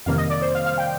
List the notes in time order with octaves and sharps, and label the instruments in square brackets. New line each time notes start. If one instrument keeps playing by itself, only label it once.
[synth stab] F2 C3 D#3 G3 A#3 F5
D#5
D5
C5
F5
F5
G5